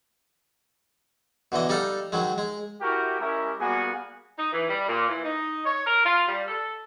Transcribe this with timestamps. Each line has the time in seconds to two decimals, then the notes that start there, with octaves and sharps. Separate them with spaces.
1.52 B2 D3 E3 D#5
1.69 G3 D#4 A4 F5
2.12 D#3 F#3 G#3
2.38 G#3
2.81 E4 F#4 G4 A#4 G5 A#5
3.20 G#3 C#4 E4 G4 A#4
3.60 G3 A#3 B3 F#4 G#4 G#5
4.38 D#4
4.52 E3
4.68 G3
4.88 A#2
5.08 E3
5.24 D#4
5.65 C#5
5.86 A#4
6.05 F4
6.27 G3
6.48 A4